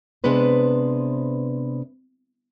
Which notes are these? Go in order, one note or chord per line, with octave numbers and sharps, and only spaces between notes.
C3 G#3 B3 D4 B4 C5